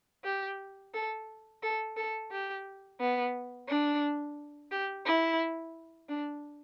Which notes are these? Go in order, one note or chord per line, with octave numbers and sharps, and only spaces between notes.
G4
A4
A4
A4
G4
B3
D4
G4
E4
D4